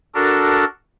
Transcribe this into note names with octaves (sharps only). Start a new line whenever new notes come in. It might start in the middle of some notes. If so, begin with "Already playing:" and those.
D4 F#4 A4 A#4